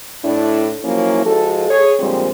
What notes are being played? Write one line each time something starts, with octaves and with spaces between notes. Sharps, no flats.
A2 D4 E4
F3 F#3 A#3 C#4 E4
F3 G#3 F#4 A4
G#4 C#5
A#2 D3 F3 G3 G#3 C4